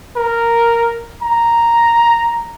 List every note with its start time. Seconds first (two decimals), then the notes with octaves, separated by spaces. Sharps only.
0.16 A#4
1.22 A#5